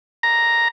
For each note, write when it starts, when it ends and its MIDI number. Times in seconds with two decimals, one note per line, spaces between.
0.23 0.68 82